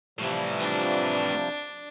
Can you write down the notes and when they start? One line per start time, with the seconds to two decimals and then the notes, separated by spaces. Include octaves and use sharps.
0.19 A2 C3 E3 F3 G3
0.59 D4